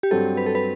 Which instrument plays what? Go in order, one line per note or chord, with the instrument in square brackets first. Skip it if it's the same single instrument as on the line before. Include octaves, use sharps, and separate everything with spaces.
[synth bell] G4
[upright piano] G2 F#3 C4 [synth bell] A4
[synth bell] B4
A4
B4